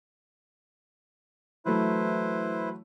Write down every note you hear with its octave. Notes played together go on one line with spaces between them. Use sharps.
E3 F#3 A3 E4 B4 C5